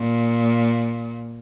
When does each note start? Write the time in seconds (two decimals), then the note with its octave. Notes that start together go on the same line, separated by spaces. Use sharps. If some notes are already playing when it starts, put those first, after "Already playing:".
Already playing: A#2